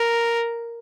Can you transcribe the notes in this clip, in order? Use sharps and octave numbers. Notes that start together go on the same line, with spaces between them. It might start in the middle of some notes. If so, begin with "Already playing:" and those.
Already playing: A#4